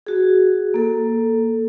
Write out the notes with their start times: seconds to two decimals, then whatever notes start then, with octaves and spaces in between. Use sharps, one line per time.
0.07 F#4 G#4
0.74 A#3 A4